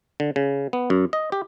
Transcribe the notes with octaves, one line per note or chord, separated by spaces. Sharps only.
D3
C#3
B3
F#2
D#5
G4